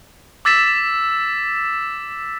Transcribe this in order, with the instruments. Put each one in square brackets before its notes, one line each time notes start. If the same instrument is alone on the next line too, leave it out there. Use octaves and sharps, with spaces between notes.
[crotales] D6 E6 A6 B6 E7